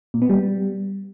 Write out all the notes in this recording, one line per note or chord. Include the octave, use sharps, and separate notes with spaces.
A#2
B3
G3